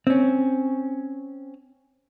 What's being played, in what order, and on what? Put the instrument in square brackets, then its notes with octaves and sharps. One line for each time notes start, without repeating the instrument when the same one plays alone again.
[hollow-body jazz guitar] C4 C#4